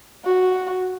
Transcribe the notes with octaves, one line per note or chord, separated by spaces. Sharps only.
F#4